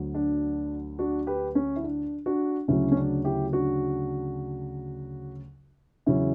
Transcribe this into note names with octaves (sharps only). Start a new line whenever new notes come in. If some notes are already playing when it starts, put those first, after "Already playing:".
Already playing: D2 D3 F#3
D4
D4 F#4
G4 B4
C#4
E4
D4
D4 F#4
D2 C#3 F#3 C#4 E4
C#4
D4
E4 G4
D4 F#4
E2 C#3 F#3 C#4 E4